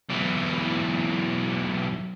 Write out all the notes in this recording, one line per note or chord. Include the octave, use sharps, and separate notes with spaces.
B1 E3